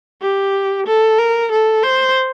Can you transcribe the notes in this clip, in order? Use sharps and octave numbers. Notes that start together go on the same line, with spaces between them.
G4
A4
A#4
A4
C5